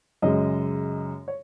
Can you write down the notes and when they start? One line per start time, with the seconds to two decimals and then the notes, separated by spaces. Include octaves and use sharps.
0.22 F#2 C#3 G#3 D#5
1.28 C#5